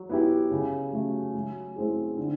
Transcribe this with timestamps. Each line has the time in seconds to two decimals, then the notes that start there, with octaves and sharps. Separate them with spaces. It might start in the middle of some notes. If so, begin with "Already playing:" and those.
Already playing: F#3
0.09 B3 E4 G4
0.51 C#3
0.93 F#3 A3 C#4
1.34 F#3
1.76 A3 C4 E4 G#4
2.17 D3